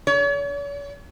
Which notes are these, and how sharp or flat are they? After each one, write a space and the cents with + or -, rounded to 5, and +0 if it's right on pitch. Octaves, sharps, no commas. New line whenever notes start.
C#5 +45